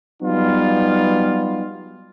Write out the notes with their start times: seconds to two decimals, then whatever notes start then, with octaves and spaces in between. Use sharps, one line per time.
0.21 F#3 G3 B3 D#4 F4